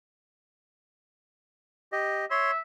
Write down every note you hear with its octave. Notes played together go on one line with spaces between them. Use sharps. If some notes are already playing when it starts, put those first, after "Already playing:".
G4 D#5
C#5 E5 C6